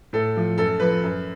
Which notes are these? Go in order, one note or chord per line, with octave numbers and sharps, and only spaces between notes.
A2 A4
F3
F#2 A4
F3 B4
F#2